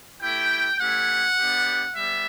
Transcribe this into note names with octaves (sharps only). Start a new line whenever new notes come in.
A3 E4 G4 G5
A3 C#4 E4 G4 F#5
B3 D4 G4
G3 B3 E5